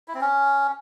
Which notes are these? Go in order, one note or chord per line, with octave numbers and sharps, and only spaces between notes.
E4
C4
C#4